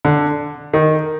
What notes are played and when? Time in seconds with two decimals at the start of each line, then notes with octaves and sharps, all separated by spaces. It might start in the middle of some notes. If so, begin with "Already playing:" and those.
0.05 D3
0.73 D#3